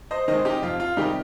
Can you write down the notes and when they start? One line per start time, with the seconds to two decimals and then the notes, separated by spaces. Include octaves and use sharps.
0.11 C5 D#5
0.28 D#3 G#3 C5 D#5
0.45 D#4 G4
0.62 F2 F4
0.80 F4
0.97 C3 D#3 G3 D#4 G4